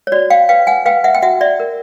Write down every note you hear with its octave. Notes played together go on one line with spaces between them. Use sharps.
C#5
F#4 D5
F5 G5
B4 F5 G5
F#5 G#5
B4 F5 G5
E5 F#5
G5
F#4 E5 F#5
D5 E5
A#4